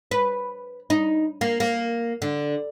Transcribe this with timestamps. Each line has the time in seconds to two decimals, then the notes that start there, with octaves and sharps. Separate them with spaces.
0.11 B4
0.90 D#4
1.41 A#3
1.60 A#3
2.22 D3